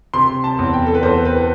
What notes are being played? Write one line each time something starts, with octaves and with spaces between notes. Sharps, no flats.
C3 C6
A5
E2
G5
A4
B4
E2 C5
B4